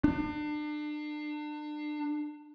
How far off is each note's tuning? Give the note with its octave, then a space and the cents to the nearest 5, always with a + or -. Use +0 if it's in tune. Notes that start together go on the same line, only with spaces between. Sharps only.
D4 +35